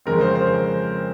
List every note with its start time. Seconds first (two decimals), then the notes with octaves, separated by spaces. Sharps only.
0.06 F2 C#3 G#3 C4 A#4
0.21 C5
0.35 C5